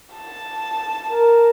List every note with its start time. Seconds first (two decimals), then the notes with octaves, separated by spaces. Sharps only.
0.15 A5
1.11 A#4